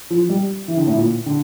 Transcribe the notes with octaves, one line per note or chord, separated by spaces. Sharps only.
F3
G3
E3
D3
A2
A#2
D3